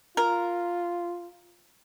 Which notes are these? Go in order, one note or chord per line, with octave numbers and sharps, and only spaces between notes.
F4 A#4